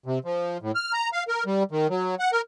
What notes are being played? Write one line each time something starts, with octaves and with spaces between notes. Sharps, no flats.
C3
F3
A2
F6
A#5
F5
A#4
G3
D#3
F#3
F#5
A#4